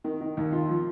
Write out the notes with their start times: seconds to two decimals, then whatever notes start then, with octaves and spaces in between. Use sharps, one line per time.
0.04 D#3
0.21 D#3
0.37 D#2
0.53 F4
0.69 F3